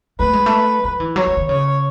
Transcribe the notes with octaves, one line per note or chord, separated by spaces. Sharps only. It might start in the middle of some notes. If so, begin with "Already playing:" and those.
A3 B4
G#3
A3
F#3
E3
F#3 C#5
F#3
D#3
C#3 C#5